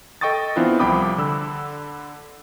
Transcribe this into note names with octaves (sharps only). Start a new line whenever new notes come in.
A4 D#5 G5 C#6 D#6 A6
E3 B3 C4 D4 E4 F4
C2 F3 G5 B5 D6 D#6
D3 B5 E6